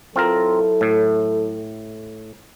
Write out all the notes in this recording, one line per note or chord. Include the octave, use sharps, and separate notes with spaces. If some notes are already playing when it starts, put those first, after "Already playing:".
F#3 C4 E4 F4 A4 A#4
A2